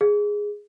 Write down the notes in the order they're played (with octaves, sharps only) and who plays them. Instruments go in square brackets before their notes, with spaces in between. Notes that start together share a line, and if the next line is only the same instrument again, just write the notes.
[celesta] G#4